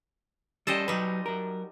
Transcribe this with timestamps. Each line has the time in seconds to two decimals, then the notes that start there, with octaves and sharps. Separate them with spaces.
0.67 G3 C#4 G4 A4 C5 D#5
0.88 F#3 G3 D#4 B4
1.26 F#3 A#4